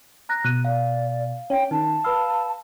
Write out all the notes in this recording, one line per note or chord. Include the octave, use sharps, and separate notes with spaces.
A#5 F#6 A#6
B2 F#6 D#7
D5 F5
C#4 G5
D#3 A5
B4 F5 B5 E6